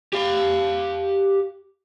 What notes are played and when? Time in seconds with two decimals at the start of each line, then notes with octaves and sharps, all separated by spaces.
0.13 G4 F5